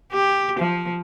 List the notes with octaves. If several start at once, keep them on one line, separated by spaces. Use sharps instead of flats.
G4
F3